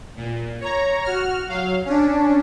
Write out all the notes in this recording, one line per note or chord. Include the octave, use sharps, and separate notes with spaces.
A#2
C#5 A#5
F#4 F6
F#3 F5
C#4 D4